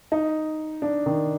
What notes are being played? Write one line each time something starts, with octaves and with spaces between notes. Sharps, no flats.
D#4
D4
D#3